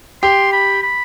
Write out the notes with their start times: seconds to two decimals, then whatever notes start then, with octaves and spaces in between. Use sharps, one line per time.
0.22 G4 G5 C6
0.52 B5
0.83 B5